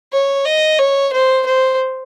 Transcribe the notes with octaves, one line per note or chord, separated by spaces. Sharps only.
C#5
D#5
C#5
C5
C5